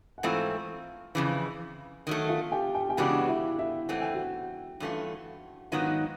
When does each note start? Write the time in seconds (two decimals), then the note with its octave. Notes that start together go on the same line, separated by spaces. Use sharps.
0.18 F#5
0.23 G#2 E3 A3 C4 F4 F5
1.15 F2 C#3 E3
2.07 D#3 F#3 A3
2.29 F4 F5
2.52 G4 G5
2.75 G5
2.89 G4 G5
2.97 C#3 E3 G#3 B3 D4 F#4 F#5
3.28 E4 E5
3.59 E4 E5
3.89 E3 A3 C4 F#5
4.02 G5
4.14 F#4 F#5
4.80 G2 E3 A3 C#4 F4
5.72 G#2 D#3 F#3 B3 D#4 F4 F5